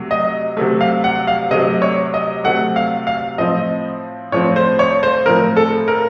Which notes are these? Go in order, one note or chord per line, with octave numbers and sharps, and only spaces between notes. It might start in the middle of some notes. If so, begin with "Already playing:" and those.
Already playing: C3 F#3 A3
D#5
C3 F#3 A3
F5
F#5
F5
C3 F#3 A3 D#5
C#5
D#5
C3 F#3 A3 F#5
F5
F5
A2 F3 C4 D#5
A2 F3 C4 C#5
C5
C#5
C5
A2 F3 C4 A#4
A4
A#4